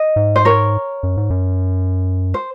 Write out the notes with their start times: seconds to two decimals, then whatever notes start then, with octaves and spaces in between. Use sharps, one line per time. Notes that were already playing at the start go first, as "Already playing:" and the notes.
Already playing: D#5
0.16 G#2
0.36 C5
0.45 A#4 C#5
1.03 F#2
1.17 G#2
1.30 F#2
2.34 C5